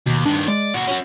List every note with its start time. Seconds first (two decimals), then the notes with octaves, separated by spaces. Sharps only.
0.06 D#2 B2
0.26 G2 D#3 D4
0.48 G#3 D5
0.74 A#2 F#4 F#5
0.87 C#4 F#4